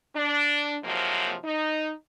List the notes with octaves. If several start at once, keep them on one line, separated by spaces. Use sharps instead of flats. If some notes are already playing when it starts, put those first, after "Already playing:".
D4
G#2 C3 F3 F#3 A#3
D#4